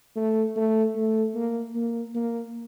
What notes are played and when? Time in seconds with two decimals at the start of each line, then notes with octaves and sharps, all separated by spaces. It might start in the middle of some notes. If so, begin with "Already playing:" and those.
0.16 A3
0.56 A3
0.96 A3
1.35 A#3
1.75 A#3
2.15 A#3